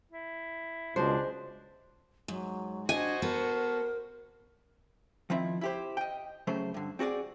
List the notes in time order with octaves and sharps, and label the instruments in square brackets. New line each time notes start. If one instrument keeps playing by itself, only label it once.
[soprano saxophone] E4
[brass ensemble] C#2 B2 [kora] G#3 C5 [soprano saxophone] D4
[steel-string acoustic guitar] G#2 [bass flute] F#3
[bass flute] D4 [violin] F#4 C5 [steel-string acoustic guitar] D#5 [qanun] G#5
[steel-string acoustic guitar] B3 A4 [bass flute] A#4
[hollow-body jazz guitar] D#3 F3 C4 E4
E4 G4 C5
D#5 G5
C#3 F#3 A3 C5
G2 D3
C4 F#4 G#4 D5